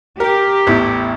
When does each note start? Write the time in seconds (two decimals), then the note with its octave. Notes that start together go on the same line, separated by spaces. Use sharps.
0.20 G4 A#4
0.67 A1 E2 E4